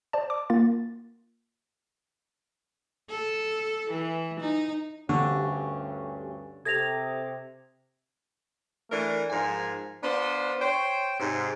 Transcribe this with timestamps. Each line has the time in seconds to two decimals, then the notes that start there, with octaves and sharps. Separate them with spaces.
0.13 C5 D5 A5
0.30 D6
0.50 A#3 F4 A6
3.09 A4
3.90 E3
4.40 D#4
5.09 D2 G2 D3 C#4 G4 C#6
6.65 C3 A4 D#6 G#6 A#6 F7
8.90 E3 A3 D4 A#4
9.30 G#2 F3 A#4 G#5
10.01 B3 D4 F4 C5
10.60 C5 C#5 G5
11.19 G#2 C3